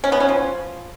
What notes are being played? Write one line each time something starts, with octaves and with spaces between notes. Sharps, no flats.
C#4
B3
C#4
F3